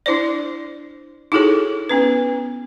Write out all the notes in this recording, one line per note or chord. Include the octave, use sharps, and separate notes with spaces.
D4 E4 C5 D5
D#4 E4 F#4 G#4 A4 C#5
B3 C#4 B4